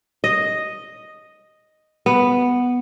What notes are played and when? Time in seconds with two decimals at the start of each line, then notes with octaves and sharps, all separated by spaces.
0.24 D#5
2.06 B3